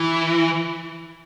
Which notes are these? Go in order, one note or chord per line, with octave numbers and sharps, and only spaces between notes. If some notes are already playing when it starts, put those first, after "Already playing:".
Already playing: E3